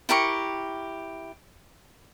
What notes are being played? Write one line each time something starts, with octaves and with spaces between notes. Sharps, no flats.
E4 G4 A#4 C#6